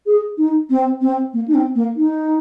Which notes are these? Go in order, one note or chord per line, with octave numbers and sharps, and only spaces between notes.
G#4
D#4
C4
C4
A#3
D#4
C4
A#3
D#4